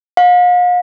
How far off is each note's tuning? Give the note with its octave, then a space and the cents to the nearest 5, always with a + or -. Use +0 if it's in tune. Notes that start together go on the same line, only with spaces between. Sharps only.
F5 +40